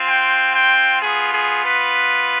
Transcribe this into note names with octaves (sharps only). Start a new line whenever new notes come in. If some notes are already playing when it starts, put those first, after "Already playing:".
Already playing: C4 F4
G5
G5
B3 F4 G#4
G#4
B4